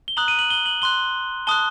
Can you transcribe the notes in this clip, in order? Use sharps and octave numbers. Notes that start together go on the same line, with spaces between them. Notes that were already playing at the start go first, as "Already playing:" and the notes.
G7
A#5 D#6 F#6 F#7
D#7
F#7
G7
F#7
C6 F#6 G7
A5 D#6 F#6 G7